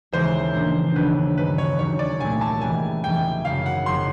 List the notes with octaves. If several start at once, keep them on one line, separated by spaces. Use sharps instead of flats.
D#2 C#3 E3 G#3 C5
A#1 A#2 F3 A#3 D4
D#2 C#3 F#3 B3 D4 B4
G2 D#3 G#3 B3 B4
C#5
E1 D#2 D#3 F#3 C#5
D5
C2 A#2 F#3 A3 G#5
A5
C#2 C3 E3 G3 B3 G#5
F1 E2 C3 E3 G3 G5
G#1 F#2 C#3 F5
F#5
F#1 F2 C3 C6